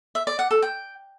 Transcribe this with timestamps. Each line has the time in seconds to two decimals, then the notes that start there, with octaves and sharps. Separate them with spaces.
0.15 E5
0.27 D5
0.39 F#5
0.51 A4
0.62 G5